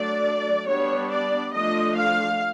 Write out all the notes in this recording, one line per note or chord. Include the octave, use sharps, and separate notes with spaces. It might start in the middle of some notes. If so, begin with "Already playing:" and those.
Already playing: F#3 A3 D4 D5
G3 B3 D4 C#5
D5
F3 A3 D4 D#5
F5